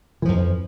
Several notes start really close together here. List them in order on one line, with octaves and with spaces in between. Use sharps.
E3 F3 F2